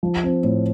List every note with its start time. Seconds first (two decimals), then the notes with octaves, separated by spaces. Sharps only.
0.03 F3
0.23 C4
0.44 A2